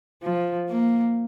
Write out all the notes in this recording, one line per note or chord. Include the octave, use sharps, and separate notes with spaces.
F3
A#3